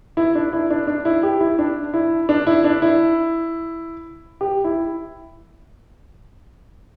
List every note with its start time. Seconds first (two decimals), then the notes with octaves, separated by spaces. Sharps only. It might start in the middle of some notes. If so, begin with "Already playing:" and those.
0.17 E4
0.35 D4
0.53 E4
0.70 D4
0.87 D4
1.05 E4
1.23 G4
1.41 E4
1.59 D4
1.94 E4
2.29 D4
2.47 E4
2.64 D4
2.82 E4
4.41 G4
4.64 E4